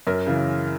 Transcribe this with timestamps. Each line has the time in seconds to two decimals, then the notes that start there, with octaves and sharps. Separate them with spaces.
0.07 F#2 A#4
0.26 C#3 E3